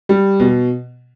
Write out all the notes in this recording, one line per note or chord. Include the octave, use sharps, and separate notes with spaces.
G3
B2